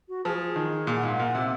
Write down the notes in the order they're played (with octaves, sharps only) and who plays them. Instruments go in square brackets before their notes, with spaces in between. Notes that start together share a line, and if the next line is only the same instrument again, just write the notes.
[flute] F#4
[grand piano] F3 [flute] G#4
[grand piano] D#3
A#2
[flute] F#5
[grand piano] G#2 [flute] F5
[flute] F#5
[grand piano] A#2
C3